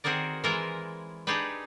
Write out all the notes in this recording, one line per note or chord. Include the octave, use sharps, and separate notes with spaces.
D#3 C4 F#4 G#4 A#4 D5
E3 G#3 E4 F4 A#4 E5
D4 D#4 G4 G#4 B4